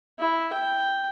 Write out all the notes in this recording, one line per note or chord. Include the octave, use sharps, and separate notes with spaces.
E4
G5